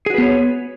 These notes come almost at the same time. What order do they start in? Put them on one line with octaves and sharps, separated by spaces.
G#4 F#4 B4 B3 C#5